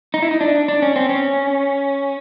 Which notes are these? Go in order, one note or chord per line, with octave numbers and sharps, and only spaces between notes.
D#4
E4
D#4
D4
D4
C#4
C4
C#4